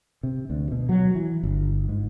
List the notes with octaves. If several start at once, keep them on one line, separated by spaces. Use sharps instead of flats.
C3
D2
B2
F#3
E3
G1
G#2